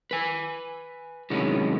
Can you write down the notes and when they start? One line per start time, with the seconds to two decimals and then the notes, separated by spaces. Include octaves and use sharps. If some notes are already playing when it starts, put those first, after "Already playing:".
0.11 B4 G#5
1.30 A2 C3 D#3 F#3 G#3 C#4